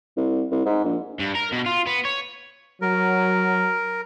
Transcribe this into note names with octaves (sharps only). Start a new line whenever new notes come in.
C2
C2
G#2
A#1
G2
A#4
B2
F4
B3
C#5
F#3 A#4